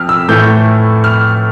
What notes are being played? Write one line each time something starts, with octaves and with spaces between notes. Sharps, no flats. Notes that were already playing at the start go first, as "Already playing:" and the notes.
Already playing: F2 F6
E6
A2 E3 A3 G6
F6